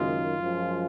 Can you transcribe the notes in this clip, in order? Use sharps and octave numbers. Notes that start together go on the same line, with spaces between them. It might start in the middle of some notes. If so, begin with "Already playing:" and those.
Already playing: F#1 F#2 D#3 G#3 F4
F#2 F3 G#3